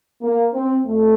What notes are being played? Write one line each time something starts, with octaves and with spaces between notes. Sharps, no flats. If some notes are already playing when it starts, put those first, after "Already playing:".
A#3
C4
F2 A3